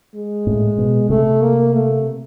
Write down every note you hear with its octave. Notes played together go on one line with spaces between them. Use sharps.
G#3
A2
B2
C3 A3
A#3
A3